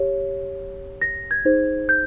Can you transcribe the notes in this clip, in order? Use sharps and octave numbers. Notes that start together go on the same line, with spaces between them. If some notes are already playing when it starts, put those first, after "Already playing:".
Already playing: G4 C#5
A#6
G#6
D#4 G#4 C5
G6